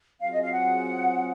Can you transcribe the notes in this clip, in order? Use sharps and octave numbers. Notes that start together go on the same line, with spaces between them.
F#3 C4 F4 G#4 F5
D#5
F5
F#5